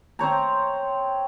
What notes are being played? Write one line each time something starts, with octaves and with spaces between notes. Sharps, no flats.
C4 C5 C#5 A#5